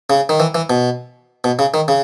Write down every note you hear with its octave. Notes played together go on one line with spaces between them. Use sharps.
C#3
D#3
E3
E3
B2
B2
C#3
D#3
C#3